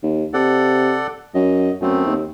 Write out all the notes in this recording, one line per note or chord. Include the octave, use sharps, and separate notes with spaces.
D#2
C3 A4 D5 F#5
F#2 D#5
F#2 A3 B3 C4
D#2